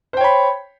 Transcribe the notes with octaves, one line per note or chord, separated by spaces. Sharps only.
C5 C#5 G5 B5